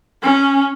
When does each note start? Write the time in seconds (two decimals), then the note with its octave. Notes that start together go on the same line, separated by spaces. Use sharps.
0.23 C#4